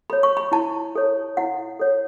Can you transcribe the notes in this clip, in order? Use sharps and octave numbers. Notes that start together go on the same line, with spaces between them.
A4 C#5 B5
C#6
B5
E4 A5
A4 C#5
E4 F#5
A4 C#5